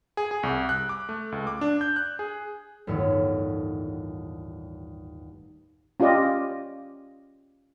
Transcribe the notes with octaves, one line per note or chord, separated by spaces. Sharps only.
G#4
G#4
C2
F#6
D6
A3
C#2
D6
D4
G6
F#6
G#4
G1 D#2 A2 E3 C#5 F#5
C#4 F4 G4 D5 D#5